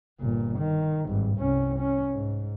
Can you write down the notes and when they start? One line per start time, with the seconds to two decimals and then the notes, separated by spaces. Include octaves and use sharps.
0.20 G1 A#2
0.58 D#3
1.07 G#1 G2
1.38 C2 C#4
1.79 C#4
2.10 G#2